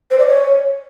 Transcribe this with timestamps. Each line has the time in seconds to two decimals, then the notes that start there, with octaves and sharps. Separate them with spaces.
0.10 C5
0.18 D5
0.26 C#5